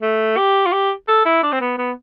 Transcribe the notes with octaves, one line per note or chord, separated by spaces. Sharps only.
A3
G4
F4
G4
A4
E4
D4
C4
B3
B3